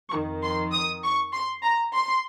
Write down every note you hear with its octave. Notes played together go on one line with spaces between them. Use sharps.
F2 D#3 C#6
C6
D#6
C#6
C6
A#5
C6